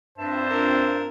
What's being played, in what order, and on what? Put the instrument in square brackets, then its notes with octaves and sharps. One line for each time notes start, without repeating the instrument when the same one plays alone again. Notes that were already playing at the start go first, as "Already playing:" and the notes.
[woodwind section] G2 E5 A5 [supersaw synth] C4 D4 F4 [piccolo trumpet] C5
[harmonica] A#4